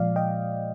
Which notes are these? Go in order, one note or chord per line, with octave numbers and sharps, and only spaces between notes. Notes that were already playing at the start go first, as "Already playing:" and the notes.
Already playing: A#2 F3 G#3 D5 F5
D#5 G5